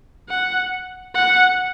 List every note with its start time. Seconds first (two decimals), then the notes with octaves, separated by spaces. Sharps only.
0.29 F#5
1.14 F#5